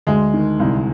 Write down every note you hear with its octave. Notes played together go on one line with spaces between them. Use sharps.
D2 G#3
D#3
C2